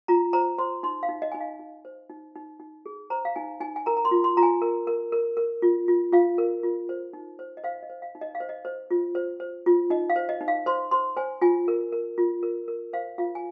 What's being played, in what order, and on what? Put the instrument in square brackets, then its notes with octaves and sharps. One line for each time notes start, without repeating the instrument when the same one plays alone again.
[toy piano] F4 A#5
C5 A#5
C5 C6
D#4 C6
F5
D#4
D#5
D#4 G#5
F5
D#4
C5
D#4
D#4
D#4
G#4
C5 A#5
F5
D#4 G#5
D#4 G#5
G#5
A#4 A#5
A#5
C6
F4
C6
F4 A#5
G#5
A#4
A#4
A#4
A#4
F4
F4
F4 F5
A#4
F4
C5
D#4
C5
D#5
C5 F5
D#5
C5
F5
D#4
D#5
F5
C5
D#5
C5
F4
C5
C5
F4
D#4 D#5
F5
C5
D#5
D#4
F5
C5 C6
C5 C6
C5 G#5
F4 G#5
A#4
A#4
F4
A#4
A#4
C5 F5
F4 F5
G#5